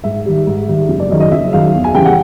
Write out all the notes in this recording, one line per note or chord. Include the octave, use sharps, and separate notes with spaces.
G#2 E5
D#3 G3
G#2
D#3 G3
F#1
D5
F#2 D#3 G#3 D#5
D#5
F#1 E5
F#2 D#3 G#3 F5
E2
G#5
C#3 E3 G3 G5
F#5